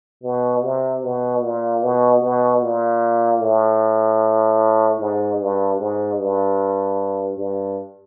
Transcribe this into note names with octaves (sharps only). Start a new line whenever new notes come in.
B2
C3
B2
A#2
B2
B2
A#2
A2
G#2
G2
G#2
G2
G2